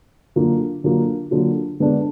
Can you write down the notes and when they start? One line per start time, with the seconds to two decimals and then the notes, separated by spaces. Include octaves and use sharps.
0.36 D3 F#3 A#3 F4
0.84 D3 F#3 A#3 F4
1.31 D3 F#3 A#3 F4
1.80 D3 G#3 B3 D4